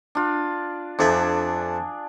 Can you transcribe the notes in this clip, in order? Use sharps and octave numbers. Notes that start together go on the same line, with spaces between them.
D4 F4
F2 D4 G#4 A4 E5